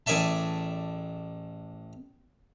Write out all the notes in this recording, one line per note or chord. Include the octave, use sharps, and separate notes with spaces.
A1 G#4 D5 E5 A5